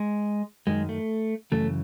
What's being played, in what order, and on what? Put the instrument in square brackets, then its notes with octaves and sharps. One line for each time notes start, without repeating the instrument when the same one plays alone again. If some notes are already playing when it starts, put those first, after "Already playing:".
Already playing: [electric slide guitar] G#3
F#2 D#3 G#3
A3
F#2 C#3 E3 A3